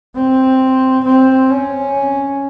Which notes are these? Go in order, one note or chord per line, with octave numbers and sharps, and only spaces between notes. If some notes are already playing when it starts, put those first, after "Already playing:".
C4
C4
C#4